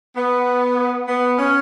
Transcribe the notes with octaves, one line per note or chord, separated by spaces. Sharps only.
B3
B3
C#4